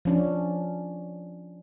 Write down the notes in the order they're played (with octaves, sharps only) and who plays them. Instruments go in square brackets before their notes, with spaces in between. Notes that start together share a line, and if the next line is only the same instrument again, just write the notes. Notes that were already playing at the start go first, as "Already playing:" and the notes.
[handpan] F3 C#4 D4